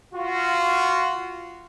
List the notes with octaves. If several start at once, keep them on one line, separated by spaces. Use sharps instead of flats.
F4 F#4